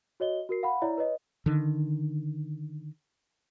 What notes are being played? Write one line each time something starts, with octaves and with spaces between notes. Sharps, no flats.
F#4 C#5 D#5 G7
F#4 A#4 C7
F5 F#5 B5
E4 C#5 D5 E5 A#5
B4 C#5 D#5
D3 D#3